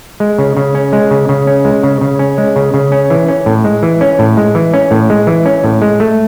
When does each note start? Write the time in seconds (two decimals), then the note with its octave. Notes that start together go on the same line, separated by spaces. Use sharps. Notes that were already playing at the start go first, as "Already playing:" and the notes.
0.20 G#3
0.38 C#3
0.57 C#3
0.75 C#4
0.93 G#3
1.11 C#3
1.29 C#3
1.47 C#4
1.65 G#3
1.83 C#3
2.01 C#3
2.19 C#4
2.38 G#3
2.56 C#3
2.74 C#3
2.92 C#4
3.10 E3
3.28 C#4
3.46 A2
3.64 G#3
3.83 E3
4.01 C#4
4.19 A2
4.37 G#3
4.55 E3
4.74 C#4
4.91 A2
5.10 G#3
5.27 E3
5.46 C#4
5.64 A2
5.82 G#3
6.00 A3